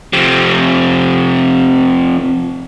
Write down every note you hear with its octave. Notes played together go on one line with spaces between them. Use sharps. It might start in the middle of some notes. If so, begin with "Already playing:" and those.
F2 C3